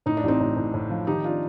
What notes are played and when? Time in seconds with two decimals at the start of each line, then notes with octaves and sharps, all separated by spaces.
0.06 A2 D#4
0.17 D4
0.24 A1 C4 D#4
0.41 A2
0.57 A2
0.74 A2
0.90 F3
1.07 D#3 D#4 G4
1.24 D4 F4